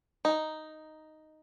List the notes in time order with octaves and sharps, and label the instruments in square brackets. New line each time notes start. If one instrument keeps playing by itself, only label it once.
[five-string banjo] D#4